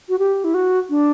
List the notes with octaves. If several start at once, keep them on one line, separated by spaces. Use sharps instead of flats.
F#4
G4
E4
F#4
D4